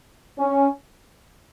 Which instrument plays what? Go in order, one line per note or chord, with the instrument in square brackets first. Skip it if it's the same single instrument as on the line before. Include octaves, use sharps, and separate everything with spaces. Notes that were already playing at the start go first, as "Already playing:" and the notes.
[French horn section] C#4